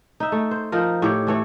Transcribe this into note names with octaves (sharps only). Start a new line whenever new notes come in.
D#4 E5
A3
C5
F3 D#4 A#4
A2 G4 C#5
E3 A3 C#5